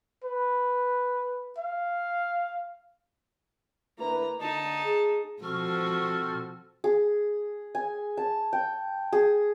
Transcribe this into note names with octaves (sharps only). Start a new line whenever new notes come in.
B4
F5
D3 A#3 E4 B4 A#5
D3 D#4 A5
G#4
B2 F3 C4 F#4 A4 C#6 F6
G#4
G#5
A5
G5
G#4